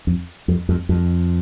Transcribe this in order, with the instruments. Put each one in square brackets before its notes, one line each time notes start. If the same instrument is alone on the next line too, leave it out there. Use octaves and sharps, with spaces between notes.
[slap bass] F2
F2
F2
F2